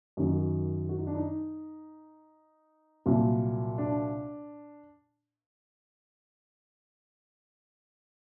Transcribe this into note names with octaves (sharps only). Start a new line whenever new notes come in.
F#2 D#3 F#3 F#4
F#4
D#4
D4
D#4
C2 A#2 F#3
D4